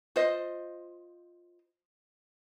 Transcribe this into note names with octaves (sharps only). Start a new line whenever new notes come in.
F4 C5 D#5